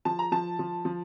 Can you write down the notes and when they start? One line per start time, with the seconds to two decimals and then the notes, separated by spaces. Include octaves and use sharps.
0.05 F3 A5
0.19 A#5
0.32 F3 A5
0.59 F3
0.85 F3